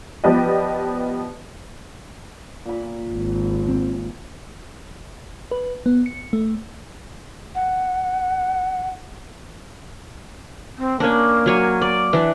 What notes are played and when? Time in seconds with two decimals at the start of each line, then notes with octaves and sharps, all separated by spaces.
0.24 F3 B3 G4 B4 D5 D#5
2.66 A#2 B5
3.10 G#1
3.69 C4
5.51 B4
5.86 B3
6.06 C#7
6.33 A3
7.55 F#5
10.78 C4
11.00 A#3 C#4 D4
11.46 F#3 C#5 G#5
11.82 D5
12.13 E3 D4